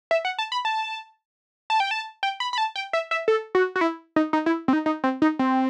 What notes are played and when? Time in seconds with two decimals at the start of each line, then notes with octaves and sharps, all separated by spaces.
0.11 E5
0.25 F#5
0.39 A5
0.52 B5
0.65 A5
1.70 A5
1.80 G5
1.91 A5
2.23 G5
2.40 B5
2.53 B5
2.58 A5
2.76 G5
2.93 E5
3.11 E5
3.28 A4
3.55 F#4
3.76 F#4
3.81 E4
4.16 D#4
4.33 D#4
4.46 E4
4.68 C4
4.73 D#4
4.86 D#4
5.04 C4
5.22 D#4
5.39 C4